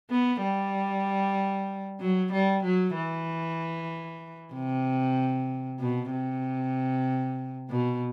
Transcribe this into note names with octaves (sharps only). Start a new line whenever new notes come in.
B3
G3
F#3
G3
F#3
E3
C3
B2
C3
B2